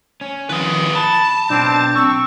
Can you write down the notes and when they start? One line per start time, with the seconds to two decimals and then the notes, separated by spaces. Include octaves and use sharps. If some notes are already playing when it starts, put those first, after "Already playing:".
0.21 C#4
0.49 D#3 F3 G#4 B4
0.95 A5 B5
1.50 B1 C4 D4
1.96 C4 C#6 E6